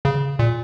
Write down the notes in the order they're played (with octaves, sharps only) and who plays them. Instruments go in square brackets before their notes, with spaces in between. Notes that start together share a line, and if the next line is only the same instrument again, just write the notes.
[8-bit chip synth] C#3
A#2